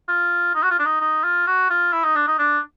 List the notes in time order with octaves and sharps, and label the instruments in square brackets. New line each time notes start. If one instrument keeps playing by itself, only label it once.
[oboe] F4
D#4
F#4
F4
D4
D#4
D#4
F4
F#4
F4
E4
D#4
D4
D#4
D4